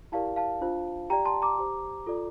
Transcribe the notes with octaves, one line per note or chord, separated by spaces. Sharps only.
E4 G4 A#4 D5 F5 A5
F5 A5
D4 F4 C5
G4 D5 G5 A#5
A5 C6
A#5 D6
G4 C5
F4 A4 D5